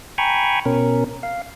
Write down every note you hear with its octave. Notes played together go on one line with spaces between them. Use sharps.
G5 G#5 A#5 B5 C#6
B2 C#4 A#4
F5